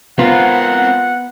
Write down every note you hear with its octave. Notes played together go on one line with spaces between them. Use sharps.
B3 C4 F4 A#4 F#5